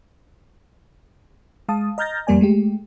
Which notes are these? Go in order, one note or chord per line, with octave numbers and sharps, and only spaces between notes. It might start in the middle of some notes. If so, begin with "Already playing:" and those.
G#3 F5 A5 D#6
D#5 A#5 F6 G6 A6 A#6
F2 G3 A#3 D5 G#5
G#3 A3 G4